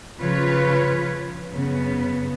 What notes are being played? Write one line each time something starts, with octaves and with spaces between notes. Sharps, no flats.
C#3 F3 F4 B4 C#5
F#2 C#3 B3